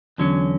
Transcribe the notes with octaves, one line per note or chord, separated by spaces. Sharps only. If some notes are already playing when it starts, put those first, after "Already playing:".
E2 D3 F#3 C#4